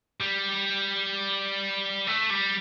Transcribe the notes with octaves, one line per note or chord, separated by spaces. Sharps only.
G3
A3
G3